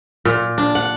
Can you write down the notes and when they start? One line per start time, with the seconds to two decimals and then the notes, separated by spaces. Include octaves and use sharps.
0.25 A#2
0.58 D4
0.75 F#5